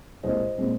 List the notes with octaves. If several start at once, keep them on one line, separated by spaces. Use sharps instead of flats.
C2 A#2 G#3 C5 D#5
A#2 G#3 C4